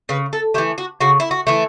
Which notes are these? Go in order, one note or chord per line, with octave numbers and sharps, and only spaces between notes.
C#3 B4
A4
E3 A3 G4
F#4
C#3 F#4
E4
F#4
E3 A3